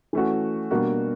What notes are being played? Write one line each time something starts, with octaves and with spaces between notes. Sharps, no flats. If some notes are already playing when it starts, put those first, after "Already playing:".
E3 A3 C#4 F#4
B2 G3 A#3 D4 F#4